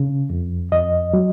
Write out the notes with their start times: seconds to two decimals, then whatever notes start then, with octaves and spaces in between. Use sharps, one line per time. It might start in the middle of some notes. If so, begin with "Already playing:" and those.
Already playing: C#3
0.30 F2
0.72 F2 D#5
1.13 F#3